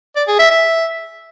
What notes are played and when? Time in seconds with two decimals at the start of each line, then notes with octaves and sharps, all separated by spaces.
0.16 D5
0.27 G#4
0.39 E5
0.51 E5